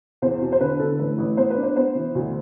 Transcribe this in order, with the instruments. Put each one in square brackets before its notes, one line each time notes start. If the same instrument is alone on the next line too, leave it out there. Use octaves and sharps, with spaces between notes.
[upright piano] E2 C5
B2
C5
D3 B4
D3 A4
A1 B4
A1
B3 C5
B4
D4
C5
B3 C5
E3
D2